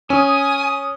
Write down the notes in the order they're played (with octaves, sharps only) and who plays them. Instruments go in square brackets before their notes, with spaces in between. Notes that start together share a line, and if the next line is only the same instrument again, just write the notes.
[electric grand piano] C#4 [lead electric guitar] G#5 [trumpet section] D#6